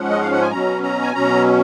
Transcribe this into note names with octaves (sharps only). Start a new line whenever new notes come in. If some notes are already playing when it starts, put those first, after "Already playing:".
Already playing: G#2 F3 G#3 C#4 F#5
D#5
F5
F#5
G#5
B2 F#3 C#4 A#5
A#5
G#5
B2 F#3 C#4 A#5